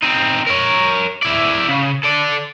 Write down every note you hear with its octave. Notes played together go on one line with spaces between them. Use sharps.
C4 D#4
A#4 C#5
E4 D5
C#3
A4 D5